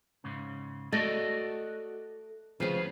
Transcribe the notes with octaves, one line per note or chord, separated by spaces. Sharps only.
G#2 C#3
A3 F#4 D5 D#5
D2 C#3 F3 G#4 B4